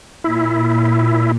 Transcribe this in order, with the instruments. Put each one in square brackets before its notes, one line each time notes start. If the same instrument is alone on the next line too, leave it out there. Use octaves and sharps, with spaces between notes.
[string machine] A#2 [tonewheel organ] E4